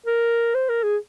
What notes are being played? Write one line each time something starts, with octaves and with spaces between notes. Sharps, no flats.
A#4
C5
A#4
G#4